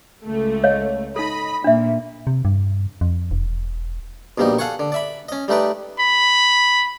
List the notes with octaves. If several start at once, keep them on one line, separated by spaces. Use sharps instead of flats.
C#2 A3
C#5 D#5 F5
D#4 A4 D#5 B5
A#2 D4 E5
C3
G2
F2
E1
A#1 B2 G3 A#3 D#4
A4 F5 F#5 G#5 C#6
D3
D5 E5 B5
C#4 D#5
G3 A3 D#4 B4 D5
B5